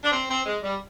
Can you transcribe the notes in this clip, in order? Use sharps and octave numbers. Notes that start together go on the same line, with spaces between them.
D4
C4
C4
G#3
G3